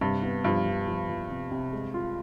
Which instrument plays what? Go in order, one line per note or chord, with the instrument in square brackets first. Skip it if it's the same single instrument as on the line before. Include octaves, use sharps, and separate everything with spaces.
[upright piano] G2 [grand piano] C3
[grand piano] B3
[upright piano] G2 [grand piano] F3
[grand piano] F3
F3
F3
C3
C3
G#3
F4